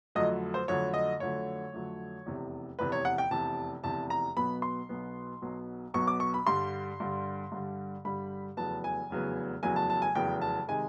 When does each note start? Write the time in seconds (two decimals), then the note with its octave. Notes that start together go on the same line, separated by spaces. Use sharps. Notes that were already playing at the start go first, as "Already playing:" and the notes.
0.15 F2 D3 F#3 A3 D#5
0.54 C5
0.68 F2 D3 F#3 A3 C#5
0.94 D#5
1.20 F2 D3 F#3 A3 C#5
1.73 F2 D3 F#3 A3
2.26 F1 E2 C3
2.79 F1 E2 C3 B4
2.92 C#5
3.05 F#5
3.18 G5
3.31 F1 E2 C3 A5
3.84 F1 E2 C3 A5
4.10 A#5
4.36 B1 B2 F#3 B3 B5
4.62 C6
4.89 B1 B2 F#3 B3
5.42 B1 B2 F#3 B3
5.94 B1 B2 F#3 B3 C#6
6.07 D6
6.20 C#6
6.34 B5
6.47 G2 D3 G3 C6
7.00 G2 D3 G3
7.52 G2 D3 G3
8.05 G2 D3 G3 B5
8.57 F1 E2 C#3 F#3 B3 A5
8.84 G#5
9.10 F1 E2 C#3 F#3 B3
9.63 F1 E2 C#3 F#3 B3 G#5
9.76 A5
9.90 A5
10.02 G#5
10.15 F1 E2 C#3 F#3 B3 G5
10.41 A5
10.68 C3 D#3 G#3 G#5